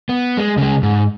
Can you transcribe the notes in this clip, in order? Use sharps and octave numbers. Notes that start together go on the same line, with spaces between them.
B3
G#3
C#3 G#3
G#2